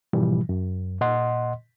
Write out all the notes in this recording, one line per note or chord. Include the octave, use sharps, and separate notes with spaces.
G#2 B2 E3 F3 G3
F#2
A#2 D#5 F#5 C6